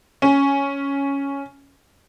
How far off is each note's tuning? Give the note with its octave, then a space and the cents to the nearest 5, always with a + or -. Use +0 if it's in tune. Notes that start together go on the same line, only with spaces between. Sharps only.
C#4 +5